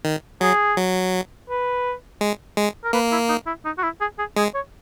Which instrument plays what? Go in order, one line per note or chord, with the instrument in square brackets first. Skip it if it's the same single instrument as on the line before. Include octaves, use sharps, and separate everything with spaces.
[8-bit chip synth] D#3
[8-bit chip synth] F#3 [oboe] G#4
[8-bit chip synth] F#3
[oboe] B4
[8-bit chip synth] G#3
G#3
[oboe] A#4
[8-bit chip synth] A#3 [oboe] B4
[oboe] E4
D#4
E4
D#4
F#4
E4
G#4
G#4
[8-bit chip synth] G#3 [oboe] G#4
[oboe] C#5